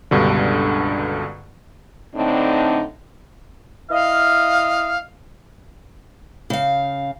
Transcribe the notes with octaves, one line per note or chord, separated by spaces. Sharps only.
C#2 G2 B2 D3
A2 D3 C4 D4 D#4
E4 D#5 F5
C#3 F5